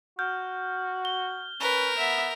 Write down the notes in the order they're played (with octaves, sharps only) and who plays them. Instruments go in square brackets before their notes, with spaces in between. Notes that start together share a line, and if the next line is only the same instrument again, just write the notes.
[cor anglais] F#4 [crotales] F6 G6
[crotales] G7
[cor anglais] C#4 [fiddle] A#4 [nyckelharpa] B4
[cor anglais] B3 [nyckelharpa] E5